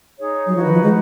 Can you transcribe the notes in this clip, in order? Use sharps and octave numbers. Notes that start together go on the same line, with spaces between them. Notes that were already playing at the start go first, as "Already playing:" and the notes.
D#4 G#4 C#5
F#3
F3 D#4 F#4 B4
D#3
F3
G#3